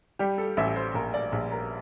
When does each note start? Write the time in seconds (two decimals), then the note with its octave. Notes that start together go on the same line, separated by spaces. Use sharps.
0.19 G3 G4
0.38 A4
0.57 A1 E5
0.76 C5
0.94 A#1 A#4
1.14 D5
1.32 A#1
1.51 A#4